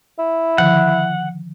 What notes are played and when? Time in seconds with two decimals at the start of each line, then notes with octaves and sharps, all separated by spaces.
0.19 E4
0.58 D3 D#3 F3 F#5